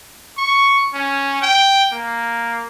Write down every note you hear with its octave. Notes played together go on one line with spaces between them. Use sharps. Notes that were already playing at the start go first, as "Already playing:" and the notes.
C#6
C#4
G5
A#3